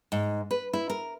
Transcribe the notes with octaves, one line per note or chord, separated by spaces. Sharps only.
G#2
B4
E4
A#4